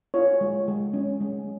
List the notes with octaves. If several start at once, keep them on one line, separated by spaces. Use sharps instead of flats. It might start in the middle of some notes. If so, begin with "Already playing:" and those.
F4 C#5
G#3
G#3
C#4
G#3